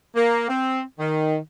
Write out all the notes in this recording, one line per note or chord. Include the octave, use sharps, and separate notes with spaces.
A#3
C4
D#3